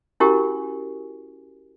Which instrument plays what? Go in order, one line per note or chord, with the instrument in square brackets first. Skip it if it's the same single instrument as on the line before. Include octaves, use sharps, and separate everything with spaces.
[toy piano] C#4 E4 F#4 G4 A#4 G#5